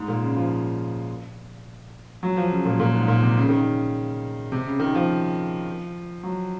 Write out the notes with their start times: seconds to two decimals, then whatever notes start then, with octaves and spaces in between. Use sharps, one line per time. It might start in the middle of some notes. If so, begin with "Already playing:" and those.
Already playing: G#2
0.08 A#2
0.22 C#3
0.36 F3
2.23 F#3
2.37 F3
2.51 C#3
2.66 A#2
2.80 A#2
2.95 G#2
3.08 A#2
3.22 C3
3.37 C#3
3.49 D#3
3.61 C#3
4.52 C3
4.66 C#3
4.80 D#3
4.95 F3
6.23 F#3